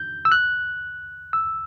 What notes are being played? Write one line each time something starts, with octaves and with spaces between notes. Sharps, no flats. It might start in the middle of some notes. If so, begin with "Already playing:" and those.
Already playing: G6
E6
F#6
E6